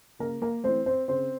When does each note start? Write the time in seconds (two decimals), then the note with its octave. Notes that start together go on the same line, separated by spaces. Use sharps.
0.19 C#3 A#3 A#4
0.42 A#3 A#4
0.64 E3 A3 C4 C5
0.86 C4 C5
1.08 C#3 C4 C5